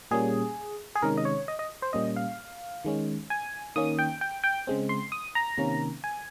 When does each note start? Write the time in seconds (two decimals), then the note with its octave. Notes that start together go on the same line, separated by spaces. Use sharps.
0.11 A#2 G3 A#3 C#4 G#4
0.95 G#4
1.02 C3 D#3 G#3 C#4 A#4
1.17 D#5
1.25 C#5
1.48 D#5
1.59 D#5
1.82 C5
1.93 A#2 G3 A#3 C#4 D#5
2.16 F5
2.85 D#3 G#3 C#4
3.30 G#5
3.76 D#3 A#3 C#4 D#6
3.99 G5
4.21 G5
4.44 G5
4.67 C#3 G#3 C4
4.89 C6
5.12 D#6
5.35 A#5
5.58 C3 D#3 A#3 C#4
6.04 G#5